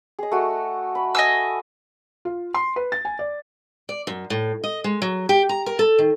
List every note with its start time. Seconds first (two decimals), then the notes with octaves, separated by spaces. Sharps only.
0.19 G#4 D#5
0.32 A3 F#4
0.95 B5
1.15 D#5 G#5 E6
2.25 F4
2.54 C6
2.76 B4
2.92 A6
3.05 G#5
3.19 D5
3.89 D5
4.07 F#2
4.30 A2
4.64 D#5
4.84 G#3
5.02 F#3
5.29 G4
5.49 A#5
5.66 A#4
5.79 A4
5.99 D#3